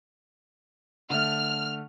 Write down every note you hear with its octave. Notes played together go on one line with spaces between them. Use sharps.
D3 A3 F6